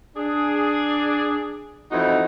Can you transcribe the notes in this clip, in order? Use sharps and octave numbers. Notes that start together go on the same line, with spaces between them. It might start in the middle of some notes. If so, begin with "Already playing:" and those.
D4 G#4
F2 E3 D#4 F#4